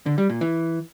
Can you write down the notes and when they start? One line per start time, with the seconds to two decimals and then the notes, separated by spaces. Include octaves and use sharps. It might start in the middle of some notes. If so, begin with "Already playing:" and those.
0.06 D3
0.18 G3
0.29 A#2
0.41 E3